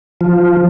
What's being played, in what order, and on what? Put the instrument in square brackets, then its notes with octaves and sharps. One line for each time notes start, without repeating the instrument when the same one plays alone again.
[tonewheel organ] F3